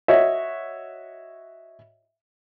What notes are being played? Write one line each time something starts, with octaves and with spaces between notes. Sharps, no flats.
F#4 C#5 D#5 E5